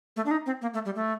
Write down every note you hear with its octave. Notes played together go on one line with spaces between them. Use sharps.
A3
D4
D#4
C4
A#3
A3
G3
A3